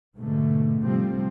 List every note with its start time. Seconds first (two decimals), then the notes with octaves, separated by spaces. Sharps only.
0.16 G#2 B2 D3 A3
0.82 C3 F3 G3 C4